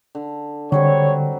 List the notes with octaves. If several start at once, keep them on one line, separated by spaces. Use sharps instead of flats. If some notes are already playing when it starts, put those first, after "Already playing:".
D3
D3 F#3 G3 C4 C#5